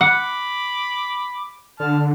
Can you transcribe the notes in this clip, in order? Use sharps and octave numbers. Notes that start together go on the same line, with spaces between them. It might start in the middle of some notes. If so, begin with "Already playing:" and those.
F#5 B5 D6
D3 A5 F6